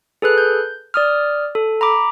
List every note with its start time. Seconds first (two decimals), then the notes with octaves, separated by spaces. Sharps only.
0.22 G#4 A4 B4 F#6
0.38 G6
0.94 D5 D#6 F6
1.55 A4
1.81 A#5 B5 D6